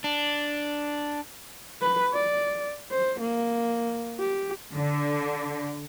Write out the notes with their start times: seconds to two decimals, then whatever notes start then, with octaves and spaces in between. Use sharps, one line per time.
0.04 D4
1.81 B4
2.13 D5
2.91 C5
3.20 A#3
4.20 G4
4.75 D3